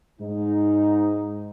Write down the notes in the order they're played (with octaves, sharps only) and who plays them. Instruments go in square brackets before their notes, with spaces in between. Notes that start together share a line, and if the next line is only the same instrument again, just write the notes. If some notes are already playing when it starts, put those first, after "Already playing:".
[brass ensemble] G#2 D#4